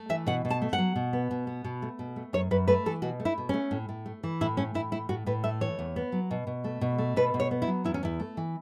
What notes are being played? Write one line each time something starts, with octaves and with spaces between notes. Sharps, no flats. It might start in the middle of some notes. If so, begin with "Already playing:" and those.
Already playing: A3
E3 E5
B2 F#5
B2
A5
A3
F#5
F#3
B2
B3
B2
B3
B2
A3
B2
A3
F#2 C#5
F#2 B4
A3 B4
E3 A4
B2 F#4
A3
E4
B2
A3 C#4
A2
A2
A3
E3
A2 E4
A3 C#4
A2 E4
A3 E4
A2 F#4
A2 B4
A3 E5
E3 C#5
E2
B3
F#3
B2
B2
A3
B2
A3
B2 B4
B2
C#5
B3
E4
F#3
E2 E4
C#4
E2 E4
A3
E3